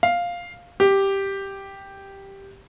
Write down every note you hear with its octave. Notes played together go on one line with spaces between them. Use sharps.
F5
G4